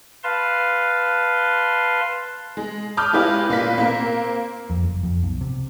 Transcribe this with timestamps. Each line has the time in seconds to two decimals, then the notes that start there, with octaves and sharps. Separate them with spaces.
0.23 B4 F5 A5 C6
2.57 G#3
2.97 A5 B5 D6 D#6 F6 G6
3.13 G#3 E4 F4 G4 B4 C#5
3.49 A#2 A#3 B4 B6
3.78 A#3 C4 A#4
4.70 F2
4.83 F#1
5.03 F2
5.23 B1
5.41 C3